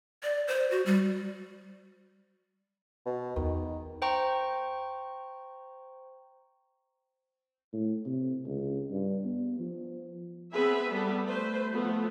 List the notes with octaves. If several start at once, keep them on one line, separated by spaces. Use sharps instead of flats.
D5
C5
F#4
G3
B2
E2 D#3
C5 G5 A#5 C#6
A2
C3
C#2
G2
B3
F3
B3 C4 G#4 B4 E5
G3 B3 A4
A3 B4 C5
F3 A3 B3